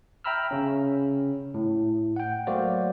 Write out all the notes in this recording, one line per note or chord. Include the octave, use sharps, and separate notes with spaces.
E5 G5 A#5 B5 E6 F6
C#3 C#4
A2
F#5 G5
F#3 A3 A#3 F#4 C5 D5